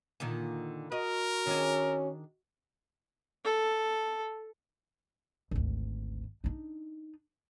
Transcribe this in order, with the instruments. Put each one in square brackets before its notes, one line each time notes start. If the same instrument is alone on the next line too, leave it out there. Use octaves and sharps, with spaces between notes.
[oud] A#2 D3 D#3
[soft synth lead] F#4 [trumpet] A#4 [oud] D#5
[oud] D#3 D4 G#4 [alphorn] C#4
[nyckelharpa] A4
[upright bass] G#1 D2
D4 D#4